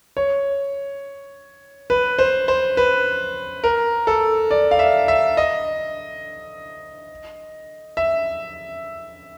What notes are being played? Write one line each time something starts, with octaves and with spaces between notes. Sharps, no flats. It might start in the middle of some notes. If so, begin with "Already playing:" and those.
C#5
B4
C5
C5
B4
A#4
A4
D5
F5
E5
E5
D#5
E5